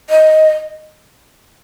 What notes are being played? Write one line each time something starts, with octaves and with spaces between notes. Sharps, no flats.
D#5